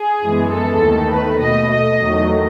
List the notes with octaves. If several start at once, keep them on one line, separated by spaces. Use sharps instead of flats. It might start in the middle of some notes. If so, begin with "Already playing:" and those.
Already playing: G#4
F#2 E3 G#3 B3
A4
D#2 D#3 A3
B4
B2 A3 D#5
D#5
E2 D#3 F#3 A3